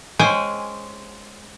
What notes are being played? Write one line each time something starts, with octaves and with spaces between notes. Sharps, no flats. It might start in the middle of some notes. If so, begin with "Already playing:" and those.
G#3 C#4 C5 G5 G#5